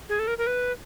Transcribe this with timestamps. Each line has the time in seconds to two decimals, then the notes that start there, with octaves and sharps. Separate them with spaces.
0.09 G#4
0.19 A4
0.27 A#4
0.38 A#4
0.47 B4